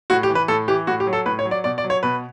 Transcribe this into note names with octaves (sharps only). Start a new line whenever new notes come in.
A2 F#4
G4
E3
B4
A2 A4
E3 G4
A2 F#4
G4
F#3
A4
A2 B4
C#5
F#3
D5
B2 D5
D5
F#3
C#5
B2 B4